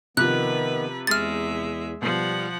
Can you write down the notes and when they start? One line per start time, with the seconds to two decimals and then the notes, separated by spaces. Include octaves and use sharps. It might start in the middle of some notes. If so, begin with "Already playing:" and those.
0.17 C3 D#3 F3 B3 B4 F#6
1.07 E2 G#3 E5 F6 A6
2.02 B2 F3 G3 F#5